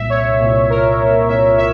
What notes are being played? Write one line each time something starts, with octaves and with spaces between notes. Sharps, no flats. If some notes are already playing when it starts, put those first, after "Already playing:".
Already playing: C2 A#2 E5
C#5
C2 A#2
A#4
C2 A#2 E5
E5